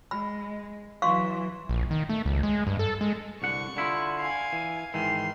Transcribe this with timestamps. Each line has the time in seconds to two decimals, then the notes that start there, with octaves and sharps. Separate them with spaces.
0.11 G#3 B5
1.02 E3 F#3 F5 C6 C#6
1.69 A#1
1.91 D#3
2.09 A3
2.26 C#2
2.43 G#3
2.67 G2
2.79 A4
3.01 G#3
3.42 C2 D3 F#5 C#6
3.77 D3 E4 F4
4.19 F5 G#5
4.53 E3
4.94 G#2 D#3 E3 C6